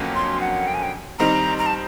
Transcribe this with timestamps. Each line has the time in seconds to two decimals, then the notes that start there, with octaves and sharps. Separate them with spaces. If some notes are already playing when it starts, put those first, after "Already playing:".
Already playing: F2 D3 F#3 A#3 C#4
0.15 C6
0.41 F#5
0.67 G5
0.74 G#5
0.83 G5
1.19 D#3 G3 C4 D#4 A#5
1.59 A#5
1.66 A5